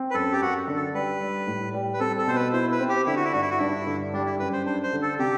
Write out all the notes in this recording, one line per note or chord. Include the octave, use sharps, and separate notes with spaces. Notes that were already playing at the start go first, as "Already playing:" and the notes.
Already playing: C4
B4
F#2 A4
G4
F#2 F#4
D3
A4
G3 B4
G3
A2
G3
B4
C4 A4
A4
B2 C5
B4
E4 C5
B4
C4
G4
D3 E4
F#4
E4
G2 F#4
E4
F#4
G2 E4
D3
G3 D4
E4
F#2 B4
C5
D4 C5
C5
D3
A4
C3 G4